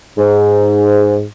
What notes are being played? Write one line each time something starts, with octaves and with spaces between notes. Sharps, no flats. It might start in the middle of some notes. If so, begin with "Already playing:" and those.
G#2